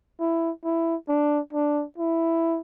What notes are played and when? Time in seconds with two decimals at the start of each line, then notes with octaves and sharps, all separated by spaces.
0.20 E4
0.64 E4
1.08 D4
1.53 D4
1.98 E4